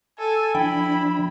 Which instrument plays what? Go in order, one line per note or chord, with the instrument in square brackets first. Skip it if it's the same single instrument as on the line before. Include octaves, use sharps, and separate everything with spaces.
[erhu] A4 [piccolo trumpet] G#5
[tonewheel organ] F3 D4 [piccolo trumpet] E4 [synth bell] G5 [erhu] B5